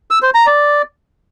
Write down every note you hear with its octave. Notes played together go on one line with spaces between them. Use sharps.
E6
C5
A#5
D5